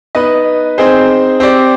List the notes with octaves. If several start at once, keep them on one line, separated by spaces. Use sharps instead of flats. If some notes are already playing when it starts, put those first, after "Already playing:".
B3 D#4 B4 D#5
C4 D#4 G#4 C5
C4 G4 D5